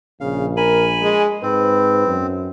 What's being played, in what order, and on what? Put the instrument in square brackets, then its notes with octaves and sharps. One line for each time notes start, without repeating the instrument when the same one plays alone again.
[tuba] A#1 [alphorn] C#3 [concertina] F5
[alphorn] A#4 [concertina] G#5 B5
[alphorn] G#3
[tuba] G#2 [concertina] C4 [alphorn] B4
[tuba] F#2